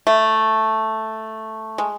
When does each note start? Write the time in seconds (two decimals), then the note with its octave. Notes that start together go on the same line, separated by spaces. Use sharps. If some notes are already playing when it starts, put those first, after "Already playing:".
0.07 A3
1.78 G#3